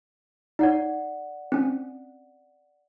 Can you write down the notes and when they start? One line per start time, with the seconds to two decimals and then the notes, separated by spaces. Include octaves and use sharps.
0.59 D#4 C#5 D5 F#5
1.52 C4 C#4